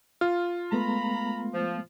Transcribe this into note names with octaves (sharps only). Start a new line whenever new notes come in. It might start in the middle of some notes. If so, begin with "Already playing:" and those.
F4 F6
G#3 A3 B3 A#5 B5
F3